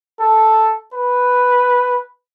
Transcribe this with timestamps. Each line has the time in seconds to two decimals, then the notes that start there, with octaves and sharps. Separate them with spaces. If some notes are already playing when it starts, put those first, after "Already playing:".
0.20 A4
0.94 B4